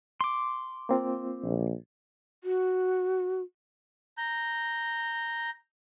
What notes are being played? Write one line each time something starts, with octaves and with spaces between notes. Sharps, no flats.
C6 D6
A#3 C4 F4
A#1
F#4
A#5 G6